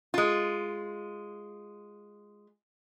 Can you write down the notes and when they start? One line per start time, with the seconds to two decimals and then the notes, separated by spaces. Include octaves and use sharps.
0.14 G#3 F4